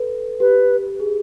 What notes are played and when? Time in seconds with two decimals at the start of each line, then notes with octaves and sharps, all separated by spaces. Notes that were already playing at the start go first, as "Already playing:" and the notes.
Already playing: A4 B4
0.40 G4 B4
1.00 G#4